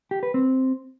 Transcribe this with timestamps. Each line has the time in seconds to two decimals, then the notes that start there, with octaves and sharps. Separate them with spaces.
0.11 G4
0.23 B4
0.34 C4